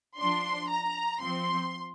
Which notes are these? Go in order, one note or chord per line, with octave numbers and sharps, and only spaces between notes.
F3 D4 C6
A#5
F3 C4 C6